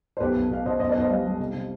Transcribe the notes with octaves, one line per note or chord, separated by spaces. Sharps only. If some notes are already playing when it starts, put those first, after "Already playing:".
C5
B1 G4 B4
B1
B2 F5
B2 C5 D#5
B1 C5 D#5
B4 D5
B1
C5 D#5
G3 D5 F5
G3
C3
C3